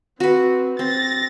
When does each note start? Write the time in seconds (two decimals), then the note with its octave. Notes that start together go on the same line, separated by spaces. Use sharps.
0.20 C4 F#4 B4
0.79 C4 A6 A#6